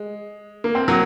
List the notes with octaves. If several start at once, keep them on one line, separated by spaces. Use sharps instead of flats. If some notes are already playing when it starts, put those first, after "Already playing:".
Already playing: G#3
A#3
C4
F#3 A#3